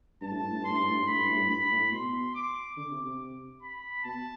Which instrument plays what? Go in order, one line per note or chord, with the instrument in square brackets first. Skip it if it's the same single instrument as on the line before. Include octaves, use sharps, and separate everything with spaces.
[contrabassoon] G2 [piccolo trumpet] A5
[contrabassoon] A2
G2
A2
[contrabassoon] G2 [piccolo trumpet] C6
[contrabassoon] A2
G2
A2
G2
[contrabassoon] A2 [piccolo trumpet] B5
[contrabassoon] G2
A2
G2
[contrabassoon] G2 [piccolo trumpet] B5
[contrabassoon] A2
[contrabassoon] B2 [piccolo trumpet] C6
[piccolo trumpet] D6
[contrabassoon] D3 [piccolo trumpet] D6
[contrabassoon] C3
C3
[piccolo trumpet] B5
[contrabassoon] B2 [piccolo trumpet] A5